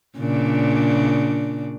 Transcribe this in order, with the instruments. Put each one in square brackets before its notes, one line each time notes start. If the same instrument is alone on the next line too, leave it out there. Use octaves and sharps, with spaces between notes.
[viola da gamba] A#2 C#3 D4